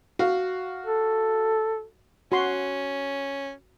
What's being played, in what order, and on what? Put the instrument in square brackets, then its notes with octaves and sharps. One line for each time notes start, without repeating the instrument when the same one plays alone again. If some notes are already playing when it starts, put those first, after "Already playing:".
[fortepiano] F#4 F5
[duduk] A4
[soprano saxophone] C#4 [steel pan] F#4 C6